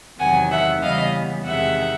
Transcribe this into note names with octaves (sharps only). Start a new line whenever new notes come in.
E2 C3 D#3 F#3 F#5 G#5
E5 F#5
C#3 E3 G3 B3 D#5 F5
E2 C3 D#3 G#3 E5 F#5